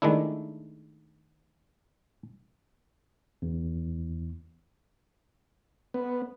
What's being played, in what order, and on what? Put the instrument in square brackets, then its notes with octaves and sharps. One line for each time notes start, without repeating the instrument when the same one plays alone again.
[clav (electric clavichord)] D#3 G#3 A3 D4 E4
[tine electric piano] E2
[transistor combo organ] B3